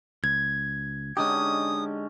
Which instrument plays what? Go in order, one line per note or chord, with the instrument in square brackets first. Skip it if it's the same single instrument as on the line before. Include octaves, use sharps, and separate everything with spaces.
[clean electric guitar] C#2 [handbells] G#6
[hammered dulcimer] D3 C#4 [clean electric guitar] G#3 D#4 G4 [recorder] D#6